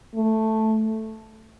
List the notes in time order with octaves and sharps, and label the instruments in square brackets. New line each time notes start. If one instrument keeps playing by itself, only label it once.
[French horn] A3